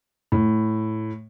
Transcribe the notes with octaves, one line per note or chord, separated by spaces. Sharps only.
A2